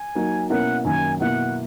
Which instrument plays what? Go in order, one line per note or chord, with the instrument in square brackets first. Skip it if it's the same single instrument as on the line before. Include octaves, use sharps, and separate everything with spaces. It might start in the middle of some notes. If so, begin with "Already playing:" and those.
Already playing: [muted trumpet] G#5
[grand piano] F#3 A#3 D#4 A#4
[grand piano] B2 A#3 C#4 E4 A#4 [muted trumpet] F#5
[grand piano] F#2 D#3 A#3 [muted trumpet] G#5
[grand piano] B2 A#3 E4 [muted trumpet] F#5